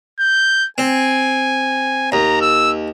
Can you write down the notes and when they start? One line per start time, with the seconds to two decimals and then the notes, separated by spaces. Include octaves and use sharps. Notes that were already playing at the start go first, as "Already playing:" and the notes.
0.20 G6
0.78 C4 G#5
2.12 D#2 A#5
2.42 E6